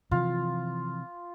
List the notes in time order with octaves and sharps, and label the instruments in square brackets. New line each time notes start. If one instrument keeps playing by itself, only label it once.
[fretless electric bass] C3 E3 F3 [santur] F4